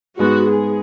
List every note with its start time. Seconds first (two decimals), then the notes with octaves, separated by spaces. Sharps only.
0.19 G#2 G#3 B3 F#4
0.50 G#4